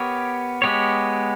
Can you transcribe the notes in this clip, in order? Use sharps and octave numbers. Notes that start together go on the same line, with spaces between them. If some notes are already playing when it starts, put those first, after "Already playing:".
Already playing: B3 G4 A#4 C#5
G#3 B3 G4 C#5